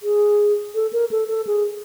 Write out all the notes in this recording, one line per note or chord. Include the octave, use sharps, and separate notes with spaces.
G#4
A4
A#4
A4
A4
G#4